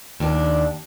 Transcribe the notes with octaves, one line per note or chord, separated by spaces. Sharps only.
D#2 D4